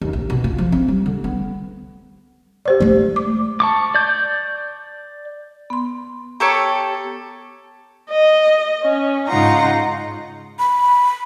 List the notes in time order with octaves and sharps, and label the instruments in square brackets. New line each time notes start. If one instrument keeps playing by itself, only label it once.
[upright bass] D#2
A#1
B2
F4
F3
C4
G3
D3
B3
[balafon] G4 C5 D5
[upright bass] G#3 A3
[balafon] D6
[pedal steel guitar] A5 C#6 D6
D5 G6
[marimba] B3 C6
[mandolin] G4 A4 C#5 [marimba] A#5
[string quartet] D#5
C#4
G#2 C#3 D#4 F4 F#5 A#5
[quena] B5